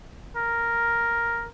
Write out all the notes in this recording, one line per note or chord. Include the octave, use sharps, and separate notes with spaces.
A#4